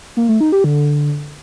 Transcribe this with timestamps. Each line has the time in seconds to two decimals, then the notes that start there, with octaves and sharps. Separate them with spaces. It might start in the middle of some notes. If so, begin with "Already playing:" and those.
0.17 A#3
0.29 A3
0.40 D#4
0.52 G4
0.64 D3